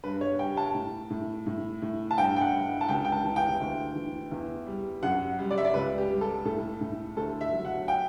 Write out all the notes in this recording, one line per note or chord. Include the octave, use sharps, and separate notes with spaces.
G2 B4
C#5
G3 G5
A5
A2
A2
A2
A2
A5
G2 G5
G5
F#5
G2
A5
C#2 G5
G5
A5
E3
G5
D2
E3
E2
G3
F#2 F#5
G3
D5
E5
D5
C#2 B4
G4
G3
A4
A2 A4
A2
D2 A4
E5
F#3
F#5
G5